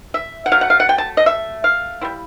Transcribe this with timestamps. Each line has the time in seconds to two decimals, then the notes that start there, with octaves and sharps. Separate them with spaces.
0.14 E5
0.46 F#5
0.52 F#3 A3 F5
0.61 F#5
0.70 F5
0.80 F#5
0.89 G5
0.98 A5
1.17 D#5
1.26 E5
1.64 F5
2.01 G3 C4 E4